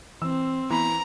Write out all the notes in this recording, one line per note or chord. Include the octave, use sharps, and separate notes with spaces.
E3 C4 E6
E3 B3 A#5 B5